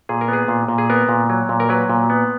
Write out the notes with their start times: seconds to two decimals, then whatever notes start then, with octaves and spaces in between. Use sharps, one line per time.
0.09 A#2 G#4
0.21 A#4
0.28 B3 G#4
0.48 A#2
0.68 A#2
0.78 G#4
0.90 B3 A#4
1.09 A#2
1.30 F#3
1.49 A#2
1.60 A#4
1.69 F#3 B4
1.90 A#2
2.10 B3